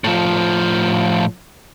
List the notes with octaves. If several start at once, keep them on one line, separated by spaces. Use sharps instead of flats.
A2 F3